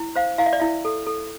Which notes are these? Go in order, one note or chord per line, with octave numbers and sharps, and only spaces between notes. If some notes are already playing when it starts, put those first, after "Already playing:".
Already playing: E4
C5 F5
E4 F5
E5
D5
E4 E5
A4
A4